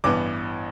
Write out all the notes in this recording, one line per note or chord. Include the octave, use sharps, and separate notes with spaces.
A1 G2 E3 B3 D6